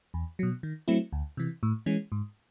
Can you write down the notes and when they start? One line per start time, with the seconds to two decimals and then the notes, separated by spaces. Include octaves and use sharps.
0.14 E2
0.39 B2 F#3
0.63 D#3
0.88 F#3 A3 C4 E4
1.13 D2
1.37 C3 E3
1.63 A2
1.86 E3 G#3 C#4
2.12 G#2